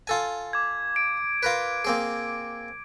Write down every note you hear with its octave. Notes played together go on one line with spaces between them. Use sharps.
F4 A4 G#5
D6 G#6
D7
F4 A#4 B4
A#3 C4 G#4